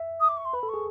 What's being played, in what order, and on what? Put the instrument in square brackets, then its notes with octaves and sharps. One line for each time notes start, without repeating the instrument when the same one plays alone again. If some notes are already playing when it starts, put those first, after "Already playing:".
Already playing: [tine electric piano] E5
[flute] D#6
D6
C#6
C6
[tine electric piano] B4 [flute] B5
[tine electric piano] A4
[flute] C#6
[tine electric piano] G#4